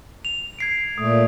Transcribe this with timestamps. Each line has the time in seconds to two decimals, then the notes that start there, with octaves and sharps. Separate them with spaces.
0.25 F7
0.59 G#6 C7 D7
0.98 A#2 A3 D#6